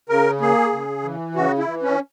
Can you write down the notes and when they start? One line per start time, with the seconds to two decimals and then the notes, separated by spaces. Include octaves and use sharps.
0.09 C#3 A#4
0.41 A#3 G#4
0.73 C#3
1.04 E3
1.35 C#3 F#4
1.59 E4
1.67 E3
1.83 C#4